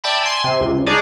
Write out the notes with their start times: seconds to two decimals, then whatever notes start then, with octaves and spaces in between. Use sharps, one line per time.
0.04 D5 E5 G5 A5 B5
0.22 G#5 C6
0.44 C3
0.60 C#2
0.86 D4 D#4 G#4 C#5 D5